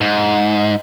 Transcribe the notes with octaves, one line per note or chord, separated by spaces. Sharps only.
G#2